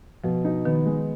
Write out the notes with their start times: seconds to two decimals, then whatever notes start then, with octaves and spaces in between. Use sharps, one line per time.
0.24 B2 F3
0.45 D#4
0.65 D#3 B3
0.86 G#3